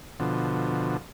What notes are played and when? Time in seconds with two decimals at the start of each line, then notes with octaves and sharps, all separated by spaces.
0.20 B2 D3 F3